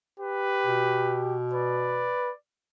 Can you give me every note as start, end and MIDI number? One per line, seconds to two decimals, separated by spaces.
0.20 1.36 67
0.20 1.28 71
0.65 2.17 47
1.53 2.31 71
1.53 2.37 74